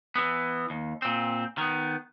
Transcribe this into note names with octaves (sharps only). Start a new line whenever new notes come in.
E3 B3
D#2
A#2 C4
D#3 B3